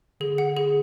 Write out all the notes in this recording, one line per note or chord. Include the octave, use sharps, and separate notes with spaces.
D3 G#4
F#5
G#4